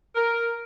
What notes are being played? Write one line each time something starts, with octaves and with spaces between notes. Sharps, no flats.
A#4